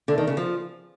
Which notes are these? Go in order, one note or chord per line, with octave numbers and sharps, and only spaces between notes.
D3
D#3
C#3
F3